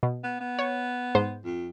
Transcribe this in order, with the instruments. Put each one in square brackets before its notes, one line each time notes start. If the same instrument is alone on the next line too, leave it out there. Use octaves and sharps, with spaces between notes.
[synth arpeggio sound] B2
[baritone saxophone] B3
B3
[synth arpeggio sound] C#5
G#2 C5
[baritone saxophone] F2